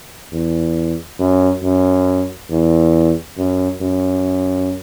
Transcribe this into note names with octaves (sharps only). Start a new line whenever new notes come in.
E2
F#2
F#2
E2
F#2
F#2